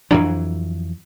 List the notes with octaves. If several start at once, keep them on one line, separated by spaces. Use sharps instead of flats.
F2 E3 F#3 D4 A#5